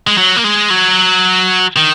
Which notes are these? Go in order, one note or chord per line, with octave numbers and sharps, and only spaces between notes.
G#3
F#3
A#3
G#3
F#3
D#3